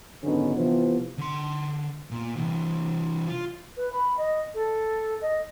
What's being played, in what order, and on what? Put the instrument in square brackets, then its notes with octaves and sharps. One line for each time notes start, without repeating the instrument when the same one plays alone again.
[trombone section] G#1 F#2 D3 B3 C#4 D#4
C3 E3 F3 B3
[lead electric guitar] D3 C6
A#2
C3 E3
F4
[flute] B4
B5
D#5
A4
D#5